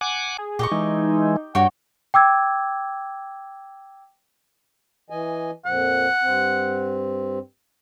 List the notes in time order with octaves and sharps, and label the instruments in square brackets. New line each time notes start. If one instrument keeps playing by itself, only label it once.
[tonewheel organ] F#5 G#5 D6
[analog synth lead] G#4
[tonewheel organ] A#2 [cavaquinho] G4 D#5 C#6
[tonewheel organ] E3 G#3 [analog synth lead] D#4
[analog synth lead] G2 [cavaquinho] F#4 C#5 [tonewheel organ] G5
[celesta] G5 D6 E6 G#6
[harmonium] E3 D#5 G#5
[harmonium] F2 A#2 F3 [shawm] F#5
[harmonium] G2 C4